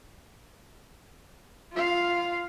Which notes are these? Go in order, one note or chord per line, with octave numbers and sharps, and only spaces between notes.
F4 F5